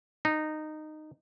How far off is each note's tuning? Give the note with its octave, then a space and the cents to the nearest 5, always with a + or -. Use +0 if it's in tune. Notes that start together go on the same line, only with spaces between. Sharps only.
D#4 -15